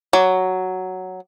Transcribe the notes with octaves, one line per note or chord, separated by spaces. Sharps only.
F#3